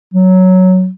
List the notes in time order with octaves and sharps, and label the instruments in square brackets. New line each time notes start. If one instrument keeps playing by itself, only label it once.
[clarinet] F#3